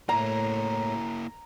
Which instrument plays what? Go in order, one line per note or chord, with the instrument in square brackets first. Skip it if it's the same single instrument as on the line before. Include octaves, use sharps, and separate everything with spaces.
[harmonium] A2 [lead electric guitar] A#3 E4 [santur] A#5